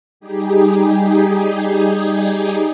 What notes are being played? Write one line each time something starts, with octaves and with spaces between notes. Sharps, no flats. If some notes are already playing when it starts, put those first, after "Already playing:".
G3 D#4 G4 G#4